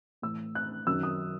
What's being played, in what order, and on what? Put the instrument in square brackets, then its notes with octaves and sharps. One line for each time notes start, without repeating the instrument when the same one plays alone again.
[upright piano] A2 E3 E6
F#6
F#2 D#3 E6
D#6